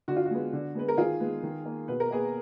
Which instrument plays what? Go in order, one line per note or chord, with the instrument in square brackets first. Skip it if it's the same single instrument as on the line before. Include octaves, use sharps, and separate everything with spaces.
[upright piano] D3 F#4
F4
F#4
G#3 B3
D3
G#3 B3 B4
A#4
D#3 F4 G#4
G#3 B3
D#3
A#3
B2 B4
A#4
A#3 G#4 B4